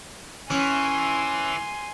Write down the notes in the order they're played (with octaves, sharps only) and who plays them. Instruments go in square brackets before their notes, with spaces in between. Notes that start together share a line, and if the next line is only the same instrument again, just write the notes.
[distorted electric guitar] E3 [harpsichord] C#4 [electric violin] G#5 C6